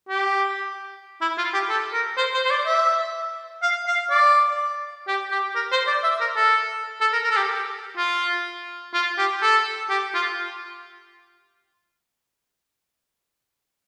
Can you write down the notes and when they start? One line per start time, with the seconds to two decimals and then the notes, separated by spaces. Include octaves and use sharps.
0.09 G4
1.21 E4
1.38 F4
1.54 G4
1.69 A4
1.93 A#4
2.17 C5
2.34 C5
2.45 C5
2.51 D5
2.66 E5
3.62 F5
3.87 F5
4.10 D5
5.08 G4
5.31 G4
5.55 A#4
5.71 C5
5.87 D5
6.03 E5
6.20 A#4
6.36 A4
7.01 A4
7.13 A#4
7.24 A#4
7.31 A4
7.37 G4
7.97 F4
8.94 F4
9.18 G4
9.42 A4
9.89 G4
10.14 F4